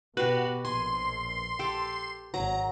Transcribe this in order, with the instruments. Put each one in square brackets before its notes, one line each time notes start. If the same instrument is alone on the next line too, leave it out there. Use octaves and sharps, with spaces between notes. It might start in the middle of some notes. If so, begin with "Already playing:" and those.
[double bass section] B2 [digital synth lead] F#4 [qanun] G4 B4
[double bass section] A#1 [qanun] G#5 [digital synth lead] C6
[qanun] G4 A4 G5
[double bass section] G#1 [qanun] F#3 [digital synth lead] A#5